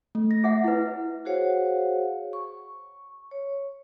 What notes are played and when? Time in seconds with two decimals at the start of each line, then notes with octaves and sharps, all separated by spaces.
0.15 A3
0.31 A#6
0.44 G#4 E5 F#5
0.64 E4 B4
1.25 F#4 G#4 C5 C#5 F5 F#5
2.33 C#6
3.31 C#5